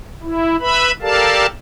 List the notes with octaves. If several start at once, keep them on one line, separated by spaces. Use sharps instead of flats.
E4
B4 E5 B5
G4 A4 A#4 D5 F5 A5